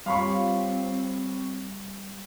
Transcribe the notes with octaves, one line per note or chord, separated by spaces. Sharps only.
G3 C4 F4 G4 C#5 F5 B5 C#6